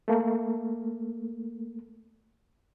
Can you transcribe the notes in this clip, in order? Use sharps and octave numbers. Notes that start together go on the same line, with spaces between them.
A3 A#3